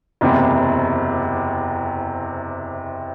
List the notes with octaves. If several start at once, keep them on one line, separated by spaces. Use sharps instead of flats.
F#1 E2 C3